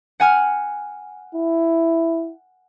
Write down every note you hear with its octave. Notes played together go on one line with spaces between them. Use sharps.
F#5 G#5 F6
E4